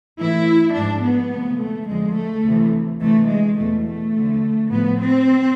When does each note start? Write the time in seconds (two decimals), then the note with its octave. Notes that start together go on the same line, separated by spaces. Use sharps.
0.19 A2 E3 E4
0.75 G#2 F3 D4
1.04 B3
1.33 D2 C3 F3
1.61 A3
1.89 F2 D3 F3 G#3
2.17 A3
2.46 D2 C3 E3
3.02 D2 C3 E3 A3
3.30 G#3
3.58 E2 B2 A3
3.86 A3
4.15 D2 D3 F3
4.71 A2 F3 B3
4.99 C4